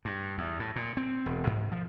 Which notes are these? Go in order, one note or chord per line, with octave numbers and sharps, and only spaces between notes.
G2
E2
A2
A#2
C4
E1
G#2
F3